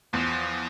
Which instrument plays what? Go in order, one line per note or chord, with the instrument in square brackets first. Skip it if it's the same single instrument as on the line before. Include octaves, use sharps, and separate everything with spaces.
[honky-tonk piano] E2 [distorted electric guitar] F3